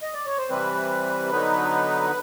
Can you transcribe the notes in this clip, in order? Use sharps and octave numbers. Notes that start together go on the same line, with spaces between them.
D#5
D5
C#5
C5
C3 E3 G3 C4 B4
D3 F#3 B3 D#4